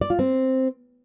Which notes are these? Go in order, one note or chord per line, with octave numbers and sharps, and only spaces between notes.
D5
F4
C4